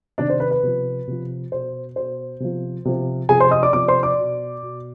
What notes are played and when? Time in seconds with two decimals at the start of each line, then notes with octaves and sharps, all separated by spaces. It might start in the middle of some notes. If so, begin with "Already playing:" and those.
0.18 C3 D#3 D4 D5
0.30 C5
0.40 B4
0.51 B4
0.63 C3 F3
1.07 C3 F3
1.52 B2 C5
1.96 B2 C5
2.40 C3 F3
2.85 C3 F3
3.29 C3 F3 G#4 G#5
3.40 C5 C6
3.51 D#5 D#6
3.63 D5 D6
3.73 C3 F3 D5 D6
3.88 C5 C6
4.03 D5 D6
4.18 B2
4.63 B2